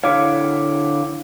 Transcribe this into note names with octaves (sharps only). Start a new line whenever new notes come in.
D3 E4 C#5 F5 D6